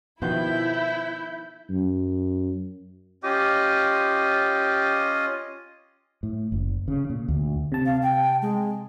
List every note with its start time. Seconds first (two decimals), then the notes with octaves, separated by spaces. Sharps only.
0.22 B2 D#3 F3 B3 E4 G6
1.69 F#2
3.24 C#4 F4 G4 D#5
6.23 A2
6.52 F#1
6.88 C#3
7.10 A#2
7.28 D2
7.72 C3 A5
7.86 F5
8.02 G5
8.42 G#3